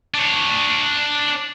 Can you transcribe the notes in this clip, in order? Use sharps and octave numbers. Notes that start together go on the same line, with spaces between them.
D4 C#5